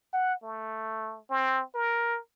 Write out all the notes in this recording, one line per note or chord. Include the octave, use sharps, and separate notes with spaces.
F#5
A3
C4
A#4